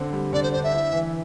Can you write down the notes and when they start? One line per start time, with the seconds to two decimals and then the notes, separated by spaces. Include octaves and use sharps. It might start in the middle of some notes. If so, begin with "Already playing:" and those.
Already playing: D3 C4
0.12 G3
0.33 D3 D5
0.43 C5
0.53 D4 C5
0.63 E5
0.73 E4
0.93 E3